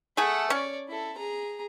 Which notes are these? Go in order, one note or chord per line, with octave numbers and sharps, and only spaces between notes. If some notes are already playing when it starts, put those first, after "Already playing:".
A3 G#4 A4 F#5
C#4 C#5 D5
E4 A4
G#4 A#5